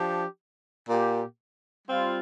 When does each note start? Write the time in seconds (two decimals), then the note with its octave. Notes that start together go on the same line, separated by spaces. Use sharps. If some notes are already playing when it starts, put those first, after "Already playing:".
Already playing: F3 D4 G4
0.90 A#2 A#3 G4
1.87 G3 C4 F4